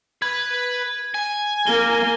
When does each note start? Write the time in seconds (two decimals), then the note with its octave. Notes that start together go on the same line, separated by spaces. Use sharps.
0.22 B4 B5 G#6
1.15 G#5
1.67 A#3 A#4 G7